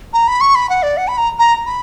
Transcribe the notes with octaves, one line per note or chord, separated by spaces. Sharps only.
A#5
B5
C#6
B5
F#5
D5
F#5
B5
A#5
A#5
B5